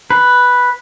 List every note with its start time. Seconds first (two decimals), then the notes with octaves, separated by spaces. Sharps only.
0.10 B4